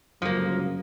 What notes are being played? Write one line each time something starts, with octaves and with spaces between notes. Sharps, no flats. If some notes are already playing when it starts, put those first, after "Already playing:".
G1 C#2 F#2 F3 A#3